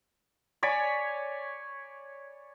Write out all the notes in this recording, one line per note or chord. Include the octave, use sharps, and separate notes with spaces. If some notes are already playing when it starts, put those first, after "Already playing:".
C#5 D5 G#5 B5